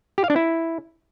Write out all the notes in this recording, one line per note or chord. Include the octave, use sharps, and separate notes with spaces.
G4
F5
D4
E4